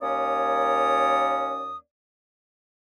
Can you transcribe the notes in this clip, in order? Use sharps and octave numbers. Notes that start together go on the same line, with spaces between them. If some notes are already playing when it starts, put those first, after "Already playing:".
D#2 A#3 C#4 C#5 D5 D#6